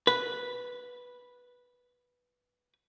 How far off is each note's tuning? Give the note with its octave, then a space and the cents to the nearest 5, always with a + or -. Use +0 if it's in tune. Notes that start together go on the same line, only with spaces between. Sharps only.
B4 -5